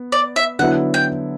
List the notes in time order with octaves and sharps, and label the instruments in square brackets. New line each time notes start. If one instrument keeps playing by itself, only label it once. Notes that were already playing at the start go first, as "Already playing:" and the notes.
Already playing: [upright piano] B3
[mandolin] D5
E5
[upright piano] D3 F#3 B3 E4 [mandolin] F#5
[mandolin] G5